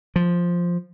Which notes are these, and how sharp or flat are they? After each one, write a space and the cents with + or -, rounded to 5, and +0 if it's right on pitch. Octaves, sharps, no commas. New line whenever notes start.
F3 +0